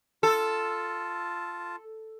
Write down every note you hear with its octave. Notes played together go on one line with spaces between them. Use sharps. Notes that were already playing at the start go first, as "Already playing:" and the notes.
F4 A4 A5